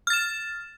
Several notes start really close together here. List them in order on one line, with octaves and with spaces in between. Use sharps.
F6 A6 E7